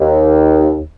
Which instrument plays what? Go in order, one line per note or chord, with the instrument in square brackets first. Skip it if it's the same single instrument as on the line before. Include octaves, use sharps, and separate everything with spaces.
[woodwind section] D#2